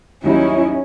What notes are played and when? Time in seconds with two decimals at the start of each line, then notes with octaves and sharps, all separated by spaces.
0.24 D#2 F#3 G3 C#4 D#4 E4